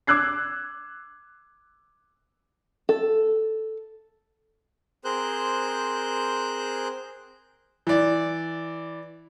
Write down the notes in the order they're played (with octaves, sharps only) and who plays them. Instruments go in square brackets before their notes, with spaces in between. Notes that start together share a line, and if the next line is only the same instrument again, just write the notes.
[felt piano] D6 E6 F#6 G#6 C7
[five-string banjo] A4
[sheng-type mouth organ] C4 G#4 A#4 C5 F#6 G6
[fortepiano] E3 D5